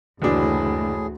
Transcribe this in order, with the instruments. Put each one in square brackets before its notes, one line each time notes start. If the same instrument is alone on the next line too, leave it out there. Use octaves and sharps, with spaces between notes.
[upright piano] F#1 D4 [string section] D2 [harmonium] A2 G#4 [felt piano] E3 F#4